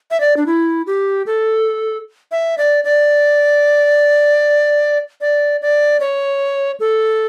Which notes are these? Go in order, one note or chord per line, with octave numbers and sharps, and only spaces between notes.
E5
D5
D4
E4
G4
A4
E5
D5
D5
D5
D5
C#5
A4